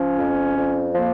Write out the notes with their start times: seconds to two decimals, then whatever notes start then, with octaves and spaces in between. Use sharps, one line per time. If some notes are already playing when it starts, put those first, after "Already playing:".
Already playing: F3 C#4
0.17 F2
0.56 F2
0.94 F3 A#3